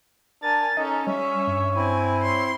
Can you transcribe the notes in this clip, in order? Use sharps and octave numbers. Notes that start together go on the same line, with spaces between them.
D4 A#4 G#5 A6
C#4 D#4 A4 D#5
G3 C#4 C#5 E5
G2
C4 E4 G#5
C#5 C6